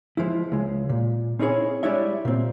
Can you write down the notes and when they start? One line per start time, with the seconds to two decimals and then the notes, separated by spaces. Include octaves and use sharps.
0.17 F3 G#3 E4
0.52 C#2 G#3
0.89 A#2
1.39 C4 C#4 D#4 E4 G#4 C#5
1.83 G3 G#3 D4 E4 C#5 E5
2.25 A#2 C4